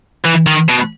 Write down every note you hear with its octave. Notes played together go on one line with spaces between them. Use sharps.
E3
D#3
B2